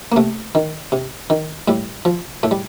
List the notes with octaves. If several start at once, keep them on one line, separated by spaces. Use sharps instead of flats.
A#3
C3 A3
D#3
C3
D#3
A2 G3
F3
A2 A3
G3